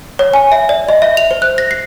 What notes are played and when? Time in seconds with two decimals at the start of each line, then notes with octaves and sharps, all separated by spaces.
0.19 C#5
0.34 G#5
0.52 E5
0.69 D5
0.89 D#5
1.02 E5
1.17 F7
1.31 C5
1.42 F#6
1.58 A#6
1.71 C7